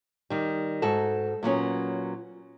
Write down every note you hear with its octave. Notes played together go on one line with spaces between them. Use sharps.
D#3 G3
G#2 F#4 A4
A#2 F#3 B3 C#4